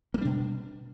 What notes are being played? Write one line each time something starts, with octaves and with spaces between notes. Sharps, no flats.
B2 G3 A#3 D4